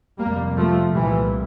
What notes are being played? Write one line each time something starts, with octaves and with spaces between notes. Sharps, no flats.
F2 C3 G3 A#3
F3 A3
C2 A#2 E3 G3